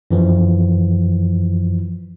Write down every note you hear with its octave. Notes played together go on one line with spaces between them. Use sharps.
F#2 E3 F3